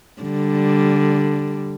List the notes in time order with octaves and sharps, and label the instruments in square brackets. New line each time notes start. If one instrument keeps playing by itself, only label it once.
[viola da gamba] D3 G3